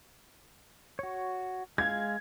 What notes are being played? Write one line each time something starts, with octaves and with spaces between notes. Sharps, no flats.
F#4 C#5
G#3 F5 G#6